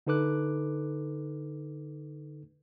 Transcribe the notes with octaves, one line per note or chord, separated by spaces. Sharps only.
D3 D#4 A4 B4 D6 F#6